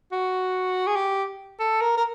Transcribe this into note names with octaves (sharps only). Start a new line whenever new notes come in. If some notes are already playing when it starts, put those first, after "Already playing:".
F#4
G#4
G4
A4
A#4
A#4